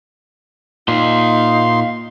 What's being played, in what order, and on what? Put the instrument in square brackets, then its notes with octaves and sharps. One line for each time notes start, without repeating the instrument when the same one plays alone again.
[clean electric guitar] A#2 [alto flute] D#4 [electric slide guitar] D#5 F5 [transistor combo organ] C6